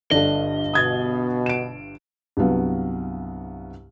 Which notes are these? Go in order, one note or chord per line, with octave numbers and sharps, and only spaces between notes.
G1 G2 D4 A4 D#5
B2 D#6 G#6 A6
D7 E7
C2 G2 F#3 B3 F5